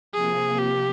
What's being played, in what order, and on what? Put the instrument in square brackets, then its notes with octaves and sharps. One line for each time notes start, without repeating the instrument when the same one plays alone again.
[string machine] C3 F3 A#3 [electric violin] G#4
[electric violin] G4